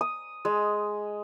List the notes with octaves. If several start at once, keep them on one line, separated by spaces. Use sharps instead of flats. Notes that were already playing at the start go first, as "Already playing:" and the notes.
D#6
G#3